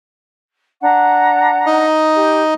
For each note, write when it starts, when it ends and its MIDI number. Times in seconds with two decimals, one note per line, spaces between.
0.81 1.84 62
0.81 1.84 78
0.81 1.84 82
1.67 2.54 63
1.67 2.54 75
2.14 2.41 67